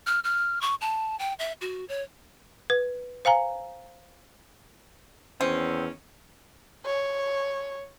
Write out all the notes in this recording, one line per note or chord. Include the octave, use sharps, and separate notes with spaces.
F6
F6
C#6
A5
G5
E5
F#4
C#5
B4
C5 F5 G#5 A#5
E2 D#3 C4 C#4
C#5